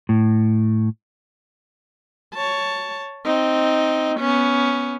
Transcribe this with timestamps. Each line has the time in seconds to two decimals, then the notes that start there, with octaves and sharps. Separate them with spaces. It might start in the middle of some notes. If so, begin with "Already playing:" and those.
0.09 A2
2.34 C#5 A5
3.25 C4 D#4
4.20 B3 C#4